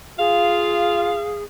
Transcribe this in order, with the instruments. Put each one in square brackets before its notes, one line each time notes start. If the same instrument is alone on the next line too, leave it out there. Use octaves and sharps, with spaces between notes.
[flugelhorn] F4 [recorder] G#4 [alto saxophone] F5